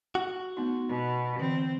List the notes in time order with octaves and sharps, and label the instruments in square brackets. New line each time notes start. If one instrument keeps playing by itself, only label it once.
[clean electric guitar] F#4
[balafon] A3 B3 D#4
[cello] B2
[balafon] D3 E3 [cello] C4